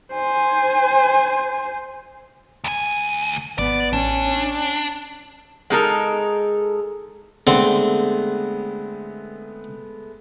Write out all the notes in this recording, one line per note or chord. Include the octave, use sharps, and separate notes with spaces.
C5 G#5
D2 G#5
G#1 B3 D5
A1 C#4 D4
G#3 D#4 A4 A#4
D3 G#3 A3 B3 C4